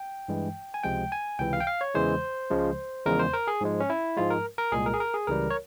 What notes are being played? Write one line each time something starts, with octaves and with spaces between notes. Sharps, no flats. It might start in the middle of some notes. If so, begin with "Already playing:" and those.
Already playing: G5
G2 E3 G#3
G#5
C#2 C3 F3 G#3 G5
G#5
C#2 C3 E3 G5
F5
G5
F5
C#5
E2 C#3 E3 G#3 C5
C#2 C#3 F3 G#3
E2 C#3 F3 G#3 A#4
C5
A#4
G#4
G#2 F3 G#3
C#4
E4
G#2 F3 G#3 F4
A#4
A#4
C2 A#2 G#3 G#4
A#4
G#4
A#4
G#4
C#2 C#3 E3 G3 A#4
C#5